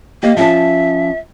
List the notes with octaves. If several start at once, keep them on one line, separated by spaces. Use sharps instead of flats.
A#3 G4 D#5 F5
F3 C#4 E5 A5